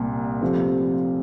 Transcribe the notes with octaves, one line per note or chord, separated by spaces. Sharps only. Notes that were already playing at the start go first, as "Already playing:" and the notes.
Already playing: C2 A#2
C3 F3 A3 C4 G4